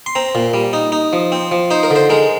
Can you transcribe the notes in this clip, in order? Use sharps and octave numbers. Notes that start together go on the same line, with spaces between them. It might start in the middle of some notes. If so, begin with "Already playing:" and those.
C6
C4 A#5
A#2
G3
D#4
D#4
F3
C4
F3
D#4 C5
A#4
D3 C5
G#3 A#4